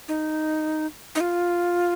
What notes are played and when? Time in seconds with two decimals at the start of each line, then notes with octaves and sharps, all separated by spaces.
0.08 D#4
1.15 D#4
1.20 F4